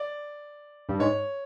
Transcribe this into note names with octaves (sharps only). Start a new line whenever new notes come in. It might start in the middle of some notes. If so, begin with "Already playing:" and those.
Already playing: D5
G2
G#2 C#5